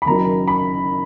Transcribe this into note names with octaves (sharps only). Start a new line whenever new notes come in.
B5
F#1 F#2 D#3 F#3 A#5
B5